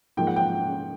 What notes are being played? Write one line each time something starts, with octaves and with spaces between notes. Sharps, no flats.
G#2 F3 A#3 G5
F#5
G5